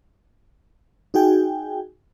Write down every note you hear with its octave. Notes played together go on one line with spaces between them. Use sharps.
D#4 F#4 G#4 G5 G#5